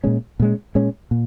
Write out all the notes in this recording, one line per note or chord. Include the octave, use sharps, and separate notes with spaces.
A#2 G#3 C#4
A#2 G#3 C#4
A#2 G#3 C#4
A#2